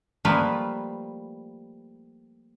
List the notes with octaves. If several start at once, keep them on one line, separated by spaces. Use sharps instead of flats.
F3 G3 A3 A#3 F4 B4